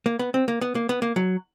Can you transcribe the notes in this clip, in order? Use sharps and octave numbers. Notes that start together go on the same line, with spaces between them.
A#3
B3
C4
A#3
B3
A#3
B3
A#3
F#3